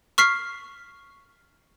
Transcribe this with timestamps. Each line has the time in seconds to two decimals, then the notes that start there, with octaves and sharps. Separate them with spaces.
0.18 C#6 F6 B6 C7